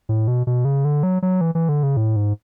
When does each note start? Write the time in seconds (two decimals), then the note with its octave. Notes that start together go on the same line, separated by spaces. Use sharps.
0.09 A2
0.28 B2
0.47 B2
0.65 C#3
0.85 D3
1.03 F#3
1.22 F#3
1.41 E3
1.55 E3
1.69 D3
1.83 C#3
1.97 A2
2.16 G#2